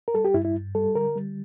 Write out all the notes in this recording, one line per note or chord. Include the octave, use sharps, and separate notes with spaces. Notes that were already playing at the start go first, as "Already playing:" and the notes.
A#4
G3 A4
G4
G2 E4
E4
G2
G3 A4
D3 A#4
G3